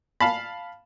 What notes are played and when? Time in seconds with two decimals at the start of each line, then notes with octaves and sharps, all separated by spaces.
0.20 F5 A5 B5